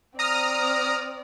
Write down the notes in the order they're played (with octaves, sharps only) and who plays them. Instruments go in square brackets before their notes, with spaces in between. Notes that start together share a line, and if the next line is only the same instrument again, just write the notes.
[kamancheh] C4 D5 [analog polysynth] A#5 D#6 F6